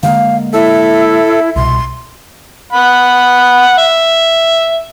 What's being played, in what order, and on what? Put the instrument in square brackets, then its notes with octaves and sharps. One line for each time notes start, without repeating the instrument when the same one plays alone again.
[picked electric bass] D3 G#3 A#3 [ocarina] F5
[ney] E4 [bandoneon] A4 [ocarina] E5
[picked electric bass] C2 B2 [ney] C6
[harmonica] F#5 B5
E5